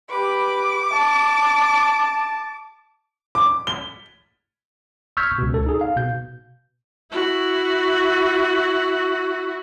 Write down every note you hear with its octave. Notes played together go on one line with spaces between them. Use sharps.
G4 B4 D6
A5
D6
G7
C#6 E6 F6 G6 G#6 B6
C#2 B2
A4
D#4 G#4
F5
B2 G6
E4 F#4